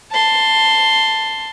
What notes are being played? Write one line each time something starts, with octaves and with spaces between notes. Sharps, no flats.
A5 C6